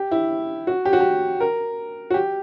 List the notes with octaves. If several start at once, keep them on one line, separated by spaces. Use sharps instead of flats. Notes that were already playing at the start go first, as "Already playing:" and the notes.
Already playing: G4
E4
F#4
G4
F#4
G4
A#4
F#4
G4